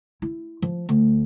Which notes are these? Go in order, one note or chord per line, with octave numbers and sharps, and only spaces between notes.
E4
F3
D2